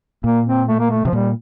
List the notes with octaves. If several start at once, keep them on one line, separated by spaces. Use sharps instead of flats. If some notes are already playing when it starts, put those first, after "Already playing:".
A#2 A#3
C4
A3
A#3
A3
C3 F3
A#2 G3